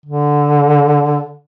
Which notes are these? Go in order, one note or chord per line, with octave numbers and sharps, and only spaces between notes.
D3